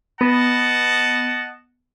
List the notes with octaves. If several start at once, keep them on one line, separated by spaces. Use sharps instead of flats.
B3 D#5 F#5 A5